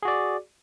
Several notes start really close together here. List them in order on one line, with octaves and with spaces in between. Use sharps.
G#4 F#4 D5